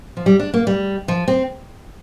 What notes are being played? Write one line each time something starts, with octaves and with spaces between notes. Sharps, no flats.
F3
G3
D4
A#3
G3
F3
C4